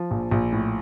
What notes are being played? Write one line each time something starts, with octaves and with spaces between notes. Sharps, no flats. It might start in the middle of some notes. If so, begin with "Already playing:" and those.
Already playing: F3
A#1
A#1
A2